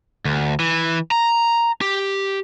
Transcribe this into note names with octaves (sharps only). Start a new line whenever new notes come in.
D2
E3
A#5
G4